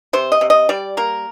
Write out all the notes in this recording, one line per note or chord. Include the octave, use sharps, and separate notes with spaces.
C3 C5
D#5
C3
D#5
G3 D5
A#3 A#4